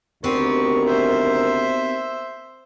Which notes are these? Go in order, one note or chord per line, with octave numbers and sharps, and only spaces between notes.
D2 D#3 B3 C4 G4 A#4 C#6
C5 E5